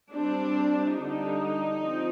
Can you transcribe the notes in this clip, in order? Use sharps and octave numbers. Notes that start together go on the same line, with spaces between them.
G3 C4 D4
D3 G3 D4 D#4
F3 C4